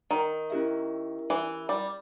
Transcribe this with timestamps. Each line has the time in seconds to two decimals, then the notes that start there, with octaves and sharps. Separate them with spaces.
0.11 D#3
0.50 C#4 E4 G4 A#4 E5
1.30 E3
1.69 G3